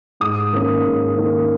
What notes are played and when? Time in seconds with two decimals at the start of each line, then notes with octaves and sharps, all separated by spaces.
0.20 G#2 D#6
0.53 D#3 A#3 C#4
0.84 G#2
1.17 D#3 A#3 C#4